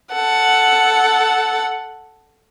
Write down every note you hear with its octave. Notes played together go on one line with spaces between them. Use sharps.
A4 F#5